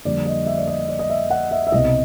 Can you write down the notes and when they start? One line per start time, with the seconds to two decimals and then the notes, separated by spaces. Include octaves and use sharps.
0.05 F2 D3 G3 A#3 D5
0.26 D#5
0.46 E5
0.58 D5
0.68 D#5
0.89 D5
0.99 D#5
1.10 E5
1.30 F#5
1.51 E5
1.67 E5
1.72 C2 B2 G3 C4 D#5